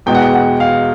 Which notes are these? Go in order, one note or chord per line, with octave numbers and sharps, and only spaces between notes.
E2 B2 G#3 G5
F#5
G5
F#5
F5